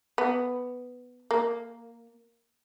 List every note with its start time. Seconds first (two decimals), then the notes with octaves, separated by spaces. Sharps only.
0.18 B3
1.31 A#3